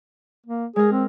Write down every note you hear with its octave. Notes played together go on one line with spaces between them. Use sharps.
A#3
G#3 G#4 A#4
C4